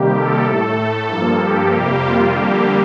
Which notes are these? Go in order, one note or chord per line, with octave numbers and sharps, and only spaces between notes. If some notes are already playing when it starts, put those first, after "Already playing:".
Already playing: C3 D#3 G3 A#3 G4
A4
A2 A3 A4
G2 F3 A#3
G4
F2 C3 G3 A#3
F4
F2 D3 G3 A#3 G4